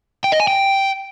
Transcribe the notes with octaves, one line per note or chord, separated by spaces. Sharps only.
G5
D#5
G#5
G5